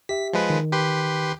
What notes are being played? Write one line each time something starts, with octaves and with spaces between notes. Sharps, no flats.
G4 E5 B6
F3 G#3 B4
D#3
G4 B4 C6